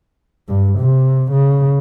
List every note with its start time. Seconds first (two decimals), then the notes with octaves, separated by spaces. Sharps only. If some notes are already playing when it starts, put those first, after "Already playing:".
0.49 G2
0.79 C3
1.32 C#3